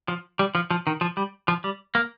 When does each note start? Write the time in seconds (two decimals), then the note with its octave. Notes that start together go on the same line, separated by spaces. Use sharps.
0.08 F3
0.39 G3
0.55 F3
0.71 F3
0.87 D#3
1.01 F3
1.17 G3
1.48 F3
1.64 G3
1.95 A#3